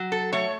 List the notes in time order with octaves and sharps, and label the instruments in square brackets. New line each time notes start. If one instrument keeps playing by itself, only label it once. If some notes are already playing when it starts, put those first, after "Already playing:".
Already playing: [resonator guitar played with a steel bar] F#3
A4
A3 C#5